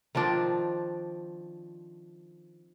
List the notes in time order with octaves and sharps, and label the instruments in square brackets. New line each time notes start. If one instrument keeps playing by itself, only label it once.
[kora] D#3 F3 C4 D4